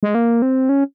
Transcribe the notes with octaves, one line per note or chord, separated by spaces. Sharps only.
G#3
A#3
C4
C#4